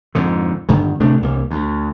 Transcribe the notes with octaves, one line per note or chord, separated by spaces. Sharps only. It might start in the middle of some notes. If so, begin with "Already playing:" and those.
F2 G#2 D3
G2 D3 D#3
D1 C3 A3 D4
C2 A#3
D2